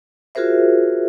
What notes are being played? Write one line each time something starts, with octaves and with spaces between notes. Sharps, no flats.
F4 F#4 G#4 A#4 C5 E5